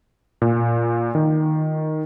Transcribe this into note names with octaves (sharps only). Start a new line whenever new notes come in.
A#2
D#3